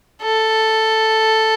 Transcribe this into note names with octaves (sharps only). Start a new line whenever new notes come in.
A4